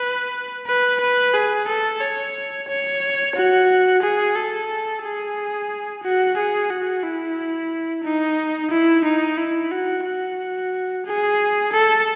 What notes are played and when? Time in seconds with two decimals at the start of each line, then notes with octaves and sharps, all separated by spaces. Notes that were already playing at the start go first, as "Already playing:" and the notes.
Already playing: B4
0.67 B4
1.01 B4
1.34 G#4
1.68 A4
2.01 C#5
2.68 C#5
3.35 F#4
4.02 G#4
4.35 A4
5.02 G#4
6.03 F#4
6.37 G#4
6.70 F#4
7.03 E4
8.04 D#4
8.70 E4
9.04 D#4
9.38 E4
9.71 F#4
10.05 F#4
11.05 G#4
11.72 A4